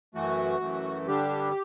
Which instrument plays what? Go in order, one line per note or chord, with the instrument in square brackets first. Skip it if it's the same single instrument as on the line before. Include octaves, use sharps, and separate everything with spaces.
[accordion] F#2 E3 A3 F#4
F#2 E3 A3
G2 D3 G3 D4 G4